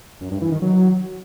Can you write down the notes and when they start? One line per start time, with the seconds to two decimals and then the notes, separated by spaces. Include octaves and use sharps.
0.21 F#2
0.31 G2
0.41 E3
0.52 D#3
0.62 F#3